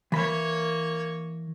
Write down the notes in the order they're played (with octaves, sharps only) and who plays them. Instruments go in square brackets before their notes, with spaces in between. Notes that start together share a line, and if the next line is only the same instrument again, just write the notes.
[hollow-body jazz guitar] E3 B5 [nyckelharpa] A#3 C#5